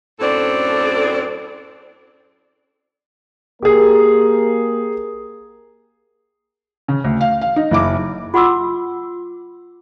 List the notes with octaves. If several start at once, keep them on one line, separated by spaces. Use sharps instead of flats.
F#2 A2 C4 D4 A4 D5
A#3 G4 G#4 A#4
C#3
D2
F5
F5
D#4
F#1 E4 D6
F4 F#5 C6 D6 E6